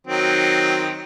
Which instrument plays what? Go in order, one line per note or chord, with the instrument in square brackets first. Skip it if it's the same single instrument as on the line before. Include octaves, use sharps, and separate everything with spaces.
[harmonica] D#3 F#3 C4